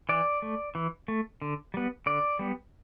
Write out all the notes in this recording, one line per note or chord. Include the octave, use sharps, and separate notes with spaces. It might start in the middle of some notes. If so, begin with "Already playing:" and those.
E3 D5
A3
E3
A3
D3
G3 B3
D3 D5
G3 B3